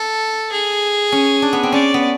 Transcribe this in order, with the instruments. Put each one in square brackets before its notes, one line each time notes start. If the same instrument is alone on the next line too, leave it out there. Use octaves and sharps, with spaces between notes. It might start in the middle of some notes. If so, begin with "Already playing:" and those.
Already playing: [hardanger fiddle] A4
G#4
[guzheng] C#4
D4
B3
C4
[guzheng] C#4 [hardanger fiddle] D5
[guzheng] B3